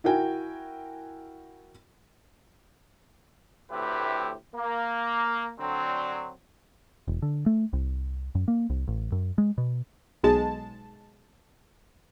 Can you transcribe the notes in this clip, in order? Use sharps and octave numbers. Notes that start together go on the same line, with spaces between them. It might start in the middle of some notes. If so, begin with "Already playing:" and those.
E4 F#4 A#4 G5 G#5
D2 A2 C4 E4 G4 B4
A#3
D3 F#3 C4
E1
D3
A3
C2
F#2
A#3
C2
A1
F#2
G#3
B2
B1 G#3 A5